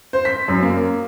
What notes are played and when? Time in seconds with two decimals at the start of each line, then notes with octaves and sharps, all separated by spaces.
0.13 C5
0.25 B6
0.48 F#2
0.62 A#3